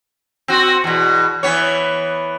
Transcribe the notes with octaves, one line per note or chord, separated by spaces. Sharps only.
C4 F#4
E2 B2
E3 B3 C#5